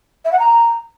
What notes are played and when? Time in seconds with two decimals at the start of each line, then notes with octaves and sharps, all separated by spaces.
0.25 E5
0.32 F#5
0.39 A#5